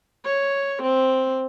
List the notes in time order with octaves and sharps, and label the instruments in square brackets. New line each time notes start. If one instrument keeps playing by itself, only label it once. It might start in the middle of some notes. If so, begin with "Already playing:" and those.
[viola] C#5
C4